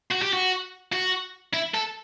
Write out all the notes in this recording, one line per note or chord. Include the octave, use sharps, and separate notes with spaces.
F#4
G4
F#4
F#4
E4
A4